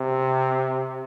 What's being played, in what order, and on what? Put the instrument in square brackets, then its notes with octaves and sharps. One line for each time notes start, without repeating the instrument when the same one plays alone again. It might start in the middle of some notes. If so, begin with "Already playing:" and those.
Already playing: [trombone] C3